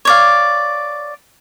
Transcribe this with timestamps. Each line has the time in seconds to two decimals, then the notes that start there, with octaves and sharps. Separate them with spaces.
0.05 C#5 D5 F5